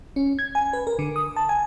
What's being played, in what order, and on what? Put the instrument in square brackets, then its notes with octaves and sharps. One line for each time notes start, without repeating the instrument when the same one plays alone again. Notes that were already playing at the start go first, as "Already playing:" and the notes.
[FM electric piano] C#4
G#6
G#5
B4
A#4
D3
D#6
A5
G#5